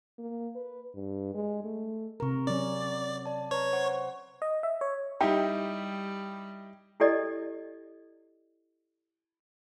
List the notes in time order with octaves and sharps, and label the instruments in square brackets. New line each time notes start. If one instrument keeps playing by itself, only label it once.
[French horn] A#3
B4
G2
G#3
A3
[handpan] C3 A#4 [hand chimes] A#5 C#6
[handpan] F#3 C#4 [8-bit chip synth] D5
[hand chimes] D5 A5
[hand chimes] B4 A#5 [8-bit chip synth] C#5
[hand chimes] C5 F#5 C#6
[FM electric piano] D#5
E5
C#5
[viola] G3 [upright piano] D#4 E4 G4 [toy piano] G5
[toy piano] E4 G4 A4 D5 D#5